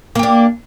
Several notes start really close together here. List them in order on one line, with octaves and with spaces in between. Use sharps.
A#3 G4 D4